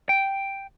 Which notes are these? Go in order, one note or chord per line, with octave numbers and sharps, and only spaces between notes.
G5